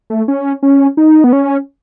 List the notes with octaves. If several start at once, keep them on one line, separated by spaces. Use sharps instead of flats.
A3
C#4
C#4
D#4
B3
C#4